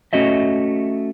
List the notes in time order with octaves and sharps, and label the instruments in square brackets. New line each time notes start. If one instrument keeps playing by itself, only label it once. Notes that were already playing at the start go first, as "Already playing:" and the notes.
[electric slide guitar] A3 C#4 F#4 D#5 E5